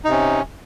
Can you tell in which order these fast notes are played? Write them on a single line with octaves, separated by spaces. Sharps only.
D#4 C3 C#4